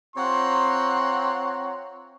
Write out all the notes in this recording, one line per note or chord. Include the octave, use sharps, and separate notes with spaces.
C4 F4 C#5 F#5 A#5 C6